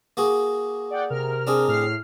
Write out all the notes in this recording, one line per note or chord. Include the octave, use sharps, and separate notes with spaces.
A#3 F#4 G#4
D5 F#5 G5
C3 A#4 F6
C4 D4 G#4
A2 F6 C7